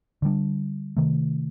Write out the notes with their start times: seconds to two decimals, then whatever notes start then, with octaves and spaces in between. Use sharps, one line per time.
0.22 D3 G3 D4
0.97 C3 D#3 A3